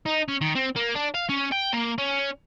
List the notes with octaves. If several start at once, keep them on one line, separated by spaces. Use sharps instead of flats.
D#4
C#4
D#3
C4
A#3
D4
F5
C#4
G5
A#3
C#4